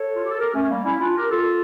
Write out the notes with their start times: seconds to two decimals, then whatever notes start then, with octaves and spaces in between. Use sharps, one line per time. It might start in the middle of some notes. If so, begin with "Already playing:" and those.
Already playing: A4 C#5
0.15 F4
0.23 G4
0.30 A4
0.38 G4 A#4
0.53 A3 C#4
0.68 G3 A#3
0.85 C#4 E4
1.00 D4 F4
1.15 G4 A#4
1.30 F4 A4